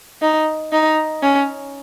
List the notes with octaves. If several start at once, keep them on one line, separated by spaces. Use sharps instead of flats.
D#4
D#4
C#4